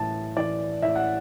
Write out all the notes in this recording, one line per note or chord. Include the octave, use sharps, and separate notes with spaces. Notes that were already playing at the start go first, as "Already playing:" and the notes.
Already playing: A2 E3 A5
E3 D5
A2 E5
F#5